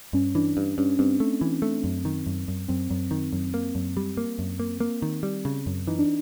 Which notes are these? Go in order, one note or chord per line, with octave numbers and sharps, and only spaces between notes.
G2 C#4
E3 D4
G2
G2 C#4
G2 C4
A3
E3
A3
F#2
D#3
F#2
F#2
F#2 C4
F#2
D#3
F#2
A#3
F#2
G3
A#3
F#2
A#3
A#3
D#3
G3
C#3
F#2
E3 D#4
D4